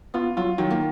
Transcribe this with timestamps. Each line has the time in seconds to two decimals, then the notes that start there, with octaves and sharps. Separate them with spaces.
0.14 B3 F4
0.37 F#3 F4
0.58 D#3 F#3
0.71 A#3